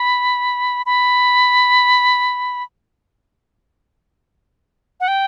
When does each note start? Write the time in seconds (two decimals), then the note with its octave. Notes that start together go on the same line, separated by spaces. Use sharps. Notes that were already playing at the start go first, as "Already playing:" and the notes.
Already playing: B5
0.86 B5
5.00 F#5
5.08 G5